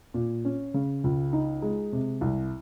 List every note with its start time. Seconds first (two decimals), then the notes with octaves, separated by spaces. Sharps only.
0.14 A#2
0.45 C#4
0.74 C#3
1.04 C#2
1.33 D#4
1.62 G#3
1.93 C3
2.21 C2